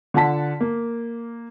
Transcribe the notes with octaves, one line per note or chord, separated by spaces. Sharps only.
D3 F4 F#5 A5 B6
A#3